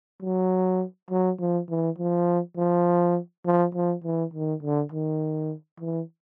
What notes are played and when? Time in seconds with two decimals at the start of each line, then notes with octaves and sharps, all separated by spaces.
0.22 F#3
1.11 F#3
1.40 F3
1.69 E3
1.99 F3
2.57 F3
3.45 F3
3.75 F3
4.04 E3
4.33 D#3
4.63 D3
4.92 D#3
5.80 E3